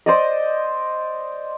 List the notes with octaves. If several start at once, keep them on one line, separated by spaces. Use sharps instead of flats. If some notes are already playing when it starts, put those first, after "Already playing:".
C5 D5 D#5